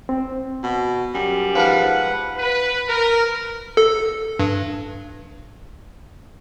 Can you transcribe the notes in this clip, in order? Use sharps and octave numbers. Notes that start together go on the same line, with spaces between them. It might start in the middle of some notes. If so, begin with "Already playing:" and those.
C4
B2
F#2 G3
G#2 F3 A#4 B4 F#5
B4
A#4
A4
G2